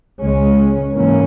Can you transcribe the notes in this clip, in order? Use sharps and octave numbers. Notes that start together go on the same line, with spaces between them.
C#2 C#3 G#3 C#4
G#2 E3 A#3 C#4